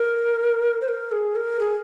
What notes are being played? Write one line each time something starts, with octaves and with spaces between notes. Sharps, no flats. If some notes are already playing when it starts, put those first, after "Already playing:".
Already playing: A#4
C5
A#4
G#4
A#4
G#4